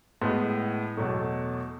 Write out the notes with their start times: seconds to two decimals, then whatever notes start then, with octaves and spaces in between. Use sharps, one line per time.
0.21 A2 G#3 B3
0.97 E2 B2 F#3 A3